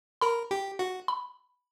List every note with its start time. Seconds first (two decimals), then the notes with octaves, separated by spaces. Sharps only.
0.21 A#4 B5
0.51 G4
0.79 F#4
1.08 B5